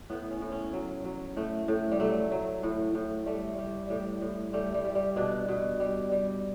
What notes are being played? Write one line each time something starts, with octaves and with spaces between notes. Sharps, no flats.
A2 B3
C#4
A2
C#4
F#3
F#3
A2 A3
A2
G3
F#3 A3
F#3
A2
A2
G3 A3
G3
A2 G3
A2
G3 A3
G3
G3
G3
B2 D4
B2
G3
G3